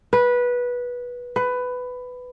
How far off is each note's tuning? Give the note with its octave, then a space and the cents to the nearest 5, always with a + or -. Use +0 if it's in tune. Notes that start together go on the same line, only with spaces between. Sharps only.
B4 -15
B4 +15